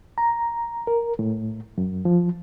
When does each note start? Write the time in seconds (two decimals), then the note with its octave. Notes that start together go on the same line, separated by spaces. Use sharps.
0.18 A#5
0.87 A#4
1.19 A2
1.78 F#2
2.05 F3